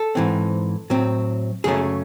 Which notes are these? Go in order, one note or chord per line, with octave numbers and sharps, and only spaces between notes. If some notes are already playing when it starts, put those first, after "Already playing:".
Already playing: A4
G#2 E3 C4
A2 F#3 C4
F#2 C#3 F#3 A3 C#4 G#4